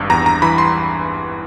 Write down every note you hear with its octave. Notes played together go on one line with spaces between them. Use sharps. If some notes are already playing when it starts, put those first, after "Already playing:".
Already playing: G#1 G2
E2 A#5
A#5
E3 B5
C6